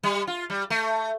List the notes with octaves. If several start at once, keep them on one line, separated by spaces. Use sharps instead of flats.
G3
F4
G3
A3